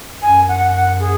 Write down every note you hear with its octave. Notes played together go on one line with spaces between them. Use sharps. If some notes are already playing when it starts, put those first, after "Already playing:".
F#2 G#5
F#5
F#5
G#4